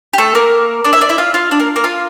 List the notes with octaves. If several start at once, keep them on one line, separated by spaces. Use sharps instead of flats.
G4
A3 A4
A#3 A#4
D4 D5
E4 E5
D4 D5
E4 E5
F4 F5
F4 F5
D4 D5
A#3 A#4
A#3 A#4
F4 F5